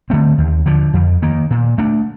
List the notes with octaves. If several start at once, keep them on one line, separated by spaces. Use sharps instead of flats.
D3 A3 C4
D#2
D3 F3
F2
D#3 A#3
A#2
A3 D4